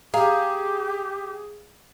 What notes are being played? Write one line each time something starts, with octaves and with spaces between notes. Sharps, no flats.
G4 G#4 F5 A#5